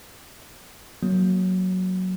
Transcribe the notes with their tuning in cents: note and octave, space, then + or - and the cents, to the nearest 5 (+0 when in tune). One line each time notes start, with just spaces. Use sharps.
F#3 +0 A#3 +0